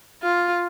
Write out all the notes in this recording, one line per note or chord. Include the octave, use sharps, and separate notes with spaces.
F4